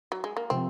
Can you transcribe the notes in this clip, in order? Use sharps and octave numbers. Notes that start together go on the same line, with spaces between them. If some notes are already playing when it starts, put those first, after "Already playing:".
F#3
G#3
A#3
C3 F3 C4